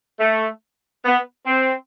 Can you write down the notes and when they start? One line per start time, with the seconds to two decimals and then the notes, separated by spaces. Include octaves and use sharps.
0.20 A3
1.04 B3
1.46 C4